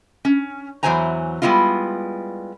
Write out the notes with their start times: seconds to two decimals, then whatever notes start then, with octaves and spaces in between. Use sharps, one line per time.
0.25 C#4
0.83 E2 E3 F#3 C5 G#5 A#5
1.42 G3 G#3 B3 E4 F4